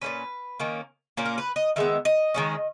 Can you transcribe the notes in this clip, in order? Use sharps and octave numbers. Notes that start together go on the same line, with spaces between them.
A#2 A#3 C#4 B4
D#3 A#3 C#4
A#2 A#3 C#4
A#4
B4
D#5
D#3 G#3 B3 E5
D#5
D#3 G#3 C#4